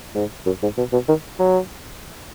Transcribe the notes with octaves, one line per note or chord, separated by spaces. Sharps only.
G#2
F#2
G#2
B2
B2
D#3
F#3